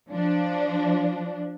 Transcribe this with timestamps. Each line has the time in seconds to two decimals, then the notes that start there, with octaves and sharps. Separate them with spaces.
0.11 F3 D4